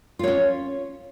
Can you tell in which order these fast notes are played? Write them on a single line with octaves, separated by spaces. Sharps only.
F4 C#5 C#4